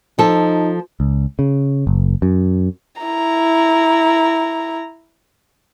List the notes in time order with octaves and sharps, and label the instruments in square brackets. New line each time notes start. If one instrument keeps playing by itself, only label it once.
[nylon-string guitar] F3 A4 [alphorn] D#4
[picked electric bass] C#2
C#3
F#1
F#2
[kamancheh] E4 A#5